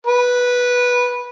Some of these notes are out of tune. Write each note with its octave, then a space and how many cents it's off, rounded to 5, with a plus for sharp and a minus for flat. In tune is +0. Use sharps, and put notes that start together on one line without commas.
B4 -10